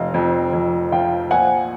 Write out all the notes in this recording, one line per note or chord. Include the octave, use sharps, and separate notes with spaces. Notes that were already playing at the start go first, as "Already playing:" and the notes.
Already playing: F1 D#5 F5
F2
F2
F3 F5 G5
A#1 F#5 G#5